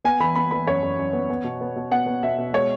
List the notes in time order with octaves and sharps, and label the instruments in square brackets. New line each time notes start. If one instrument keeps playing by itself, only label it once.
[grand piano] B3 G#5
E3 B5
B3 B5
E3 B5
F#2 C#5
F#2
F#2
B3
B3
B2
B3
B2
B3 F#5
B3
B2 E5
B2
G#3 C#5